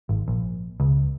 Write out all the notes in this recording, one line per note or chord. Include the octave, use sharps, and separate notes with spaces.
G#1
A#1
C#2